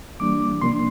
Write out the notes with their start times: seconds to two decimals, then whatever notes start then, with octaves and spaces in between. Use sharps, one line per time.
0.20 E3 G3 A#3 D4 D6
0.61 C3 F3 A#3 D4 C6